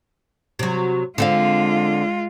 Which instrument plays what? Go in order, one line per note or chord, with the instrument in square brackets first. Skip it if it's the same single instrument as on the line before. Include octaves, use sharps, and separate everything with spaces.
[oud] C3 F#3
[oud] D3 C4 F5 [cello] G#3 F4